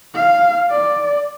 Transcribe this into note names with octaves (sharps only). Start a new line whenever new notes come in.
F5
D5